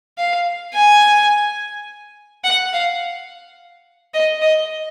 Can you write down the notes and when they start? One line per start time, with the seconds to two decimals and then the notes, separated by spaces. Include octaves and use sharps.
0.18 F5
0.74 G#5
2.44 F#5
2.73 F5
4.14 D#5
4.42 D#5